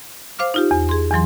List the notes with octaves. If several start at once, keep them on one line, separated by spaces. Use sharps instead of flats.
C5 F5 D6 F6
D#4 F4 G4
E2
G#4 C6
E2 E3 F#3 C6